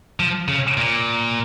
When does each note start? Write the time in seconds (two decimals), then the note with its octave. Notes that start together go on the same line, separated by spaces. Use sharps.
0.20 F3
0.48 C#3
0.77 A#2